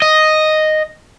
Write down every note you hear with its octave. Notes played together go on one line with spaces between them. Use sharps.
D#5